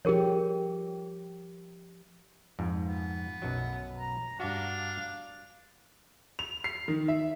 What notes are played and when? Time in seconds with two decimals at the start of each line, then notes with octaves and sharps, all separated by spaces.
0.05 F3 G4 G#4 A#4 C#5
2.59 F2 G#2
2.87 B3
3.42 B1 F#2 F#3
3.97 A#5
4.40 G2 D4 F#4 F5
6.39 F7
6.64 C7
6.88 D#3
7.08 E5